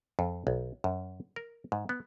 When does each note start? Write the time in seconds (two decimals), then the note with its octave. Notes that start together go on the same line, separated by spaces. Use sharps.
0.19 F2
0.47 B1
0.84 F#2
1.36 A#4
1.72 G#2
1.89 B3